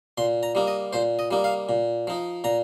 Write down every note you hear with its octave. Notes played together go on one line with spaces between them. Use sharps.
A#2 C6
A#5
G3 A#3 D#4
D#5
A#2 C5
D#5
G3 A#3 D#4
F5
A#2
F3 D#4
A#2 A#5